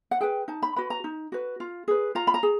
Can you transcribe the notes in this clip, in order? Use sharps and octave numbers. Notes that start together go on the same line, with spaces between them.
F#5
G#4 B4 G5
D#4 A5
B5
F#4 B4 B5
A#5
D#4
F#4 B4
F4
G#4 B4
F4 A#5
B5
A#5
G#4